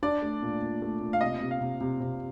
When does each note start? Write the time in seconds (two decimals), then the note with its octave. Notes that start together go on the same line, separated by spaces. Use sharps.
0.03 D4 D5
0.22 A3
0.42 A#2
0.62 A#2
0.82 A3
1.01 A#2
1.13 F5
1.21 C3 D#5
1.41 C3
1.51 F5
1.61 C3
1.81 C3
2.00 C3